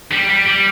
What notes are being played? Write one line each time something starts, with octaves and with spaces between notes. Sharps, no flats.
G3
G3
G3